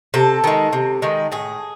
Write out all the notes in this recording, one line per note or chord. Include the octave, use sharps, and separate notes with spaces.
C3 A4
D#3 G#3
C3
D#3 G#3
A2 G#4